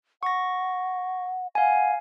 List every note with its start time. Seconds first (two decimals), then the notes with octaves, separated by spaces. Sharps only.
0.23 F#5 C#6 A#6
1.55 F5 F#5 G#5